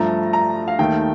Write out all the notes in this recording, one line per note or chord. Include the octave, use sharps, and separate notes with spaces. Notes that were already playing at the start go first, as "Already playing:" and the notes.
Already playing: G2 F3 A3 A#5
A#5
F5
D#2 D#3 A3 G5